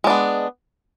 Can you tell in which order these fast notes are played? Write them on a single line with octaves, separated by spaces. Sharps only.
G#3 D4 B3